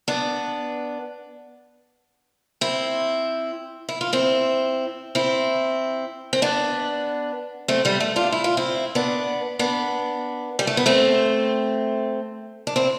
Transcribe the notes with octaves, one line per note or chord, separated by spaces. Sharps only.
B3 D4
C4 E4
E4
F4
C4 E4
C4 E4
C4
B3 D4
A3 C4
G3 B3
A3
D4 F4
E4
F4
C4 E4
B3 D4
B3 D4
G3
A3
B3
A3 C4
D4
C4 E4